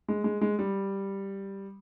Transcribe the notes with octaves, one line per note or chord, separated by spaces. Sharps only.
G#3
G#3
G#3
G3